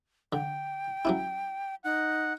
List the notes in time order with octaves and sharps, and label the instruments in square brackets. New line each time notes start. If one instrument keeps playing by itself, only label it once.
[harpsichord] D3 [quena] G5
[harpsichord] F#3 C#4 E4
[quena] D#4 [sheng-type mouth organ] F#5